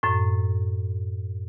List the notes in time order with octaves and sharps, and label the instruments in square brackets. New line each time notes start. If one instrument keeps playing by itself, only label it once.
[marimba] F#2 A2